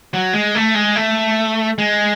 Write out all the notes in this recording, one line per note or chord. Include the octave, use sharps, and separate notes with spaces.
F#3
G#3
A3
G#3
A3
G#3